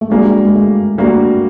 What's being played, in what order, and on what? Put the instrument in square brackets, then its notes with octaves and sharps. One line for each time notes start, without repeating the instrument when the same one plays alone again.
[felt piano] A3
[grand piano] G3 A#3 D4 F#4 [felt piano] G#3
[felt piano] G#3
A3
[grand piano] G3 A#3 D4 F#4 [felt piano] A3